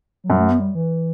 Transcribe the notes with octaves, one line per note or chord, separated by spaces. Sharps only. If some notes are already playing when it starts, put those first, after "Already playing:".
F#3
F#2 G3
A3
B3
G3
E3